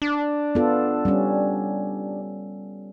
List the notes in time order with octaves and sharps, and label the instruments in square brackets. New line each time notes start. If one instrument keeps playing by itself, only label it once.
[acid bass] D4
[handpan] B3 F4 A4
G3 C#4